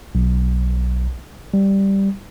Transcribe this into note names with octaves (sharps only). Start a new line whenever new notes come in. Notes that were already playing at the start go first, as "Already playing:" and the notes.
B1
G3